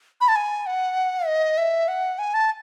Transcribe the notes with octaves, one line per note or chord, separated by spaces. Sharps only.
B5
A5
G#5
F#5
D#5
E5
F#5
G#5
A5